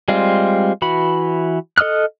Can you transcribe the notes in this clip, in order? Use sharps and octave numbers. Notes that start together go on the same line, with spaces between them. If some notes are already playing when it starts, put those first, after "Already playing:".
G3 G#3 C4 F4
E3 F#4 B5
A4 D#5 D#6 F6 F#6